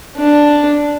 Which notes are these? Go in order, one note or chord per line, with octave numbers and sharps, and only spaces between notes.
D4